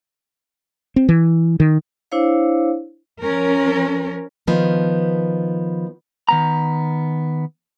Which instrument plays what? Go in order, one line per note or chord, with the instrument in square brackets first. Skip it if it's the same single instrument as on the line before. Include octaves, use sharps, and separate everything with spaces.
[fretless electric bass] C4
E3
D#3
[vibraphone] D4 E4 C5 C#5 F5
[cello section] F3 C#4 A#4
[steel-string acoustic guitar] D#3 F3 B3
[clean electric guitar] D#3 B3 A#5